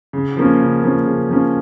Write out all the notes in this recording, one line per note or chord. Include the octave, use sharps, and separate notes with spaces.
C#3
F3 A#3 C#4
C#3
F3 A#3 C#4
C#3
F3 A#3 C#4